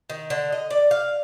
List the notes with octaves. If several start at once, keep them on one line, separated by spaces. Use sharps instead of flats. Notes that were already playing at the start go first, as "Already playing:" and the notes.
D#3
D3
D#5
D5
F5